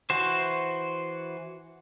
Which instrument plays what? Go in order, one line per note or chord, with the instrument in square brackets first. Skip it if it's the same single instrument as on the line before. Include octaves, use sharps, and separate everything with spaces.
[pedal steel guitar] E3 F#4 C5